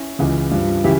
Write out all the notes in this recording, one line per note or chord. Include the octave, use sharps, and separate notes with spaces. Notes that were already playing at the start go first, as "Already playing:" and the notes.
Already playing: C#4 E4
C#2 C#3 E3
G2 F3
C#3 E3 E4 G4